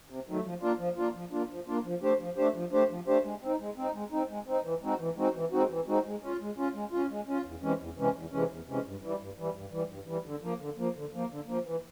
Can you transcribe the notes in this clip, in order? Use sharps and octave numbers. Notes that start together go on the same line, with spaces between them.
C3
D#3 F#3 A3
F3
A#3 D4 F4
F3
A#3 D4 F4
F3
A#3 D4 F4
F3
A#3 D4 F4
F3
A3 D4 G4 C5
F3
A3 D4 G4 C5
F3
A3 D4 G4 C5
F3
A3 D4 G4 C5
G#3
C4 D#4
G#3
C4 D#4
G#3
C4 D#4
G#3
C4 D#4
E3
G#3 C4 D#4 F#4
E3
G#3 C4 D#4 F#4
E3
G#3 C4 D#4 F#4
E3
G#3 C4 D#4 F#4
G#3
C#4 F4
G#3
C#4 F4
G#3
C#4 F4
G#3
C#4 F4
E2
C3 E3 G#3 C#4
E2
C3 E3 G#3 C#4
E2
C3 E3 G#3 C#4
E2
C3 E3 G#3 C#4
G2
E3 G3
G2
E3 G3
G2
E3 G3
G2
E3 G3
D3
F3 A#3
D3
F3 A#3
D3
F3 A#3
D3
F3 A#3
E3